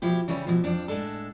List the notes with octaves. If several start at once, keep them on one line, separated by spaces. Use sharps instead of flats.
B2 F3 E4 G4
C#3 E3 G3 C#4
B2 E3 F3
F2 F3 D4
A2 G#3 D4 A4